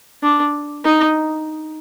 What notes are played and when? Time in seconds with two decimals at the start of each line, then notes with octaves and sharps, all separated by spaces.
0.23 D4
0.85 D#4